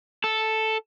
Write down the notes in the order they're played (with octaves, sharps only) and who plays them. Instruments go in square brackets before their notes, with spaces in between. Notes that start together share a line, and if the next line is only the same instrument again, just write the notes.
[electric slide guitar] A4